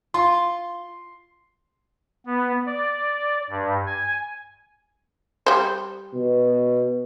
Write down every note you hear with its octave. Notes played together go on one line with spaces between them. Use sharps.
F4 C6
B3
D5
G2
G#5
G3 C5
B2